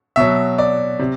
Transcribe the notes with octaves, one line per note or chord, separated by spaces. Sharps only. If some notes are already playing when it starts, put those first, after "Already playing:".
B2 F#3 E5
D5
C3